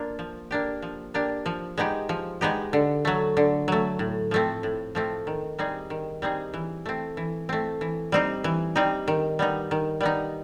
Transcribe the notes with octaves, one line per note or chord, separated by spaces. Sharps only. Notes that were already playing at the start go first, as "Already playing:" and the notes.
Already playing: A#3 D4 F4
F3
A#3 D4 G4
F3
A#3 D4 G4
F3
G#3 B3 D#4 G4
F3
G#3 B3 D#4 G4
D3
F#3 A3
D3
F#3 A3
A2
F3 A3 C4
A2
F3 A3 C4
D#3
G3 C4 D#4 G#4
D#3
G3 C4 D#4 G#4
E3
A3 C4
E3
A3 C4
E3
G3 C4 D#4
E3
G3 C4 D#4
D#3
G3 B3 D#4
D#3
G3 B3 D#4